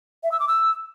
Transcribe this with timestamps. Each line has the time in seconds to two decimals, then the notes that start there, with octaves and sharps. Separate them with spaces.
0.24 E5
0.32 E6
0.40 D6
0.48 E6